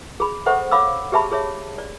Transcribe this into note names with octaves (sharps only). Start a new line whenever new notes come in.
G#4 B5
A4 C5 E5 F#5 C#6
C#5 F5 B5 D6 E6
G4 G#4 E5 A5 B5
G#4 C#5 E5
D5